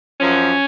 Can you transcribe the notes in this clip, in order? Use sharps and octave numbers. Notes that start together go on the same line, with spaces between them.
F#2 F3 C#4